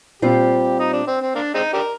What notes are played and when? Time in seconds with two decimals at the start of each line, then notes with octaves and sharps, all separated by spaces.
0.22 A#2 G3 C4 F4 G4 C5
0.79 D#4
0.93 D4
1.07 C4
1.22 C4
1.35 A#3 D4
1.55 G#3 C4 D#4
1.73 D4 G4 A#4